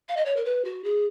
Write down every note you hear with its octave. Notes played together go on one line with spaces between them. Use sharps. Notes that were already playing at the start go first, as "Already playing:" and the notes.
F5
D#5
C#5
A#4
B4
F#4
G#4